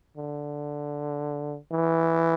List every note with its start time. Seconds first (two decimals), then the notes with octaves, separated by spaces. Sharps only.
0.17 D3
1.72 E3